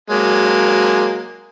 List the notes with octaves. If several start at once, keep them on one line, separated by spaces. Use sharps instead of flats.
F#3 G#3 A#3